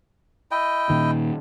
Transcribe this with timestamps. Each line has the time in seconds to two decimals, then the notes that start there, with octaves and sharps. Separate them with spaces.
0.51 E4 D#5 G5
0.90 A#2 D#3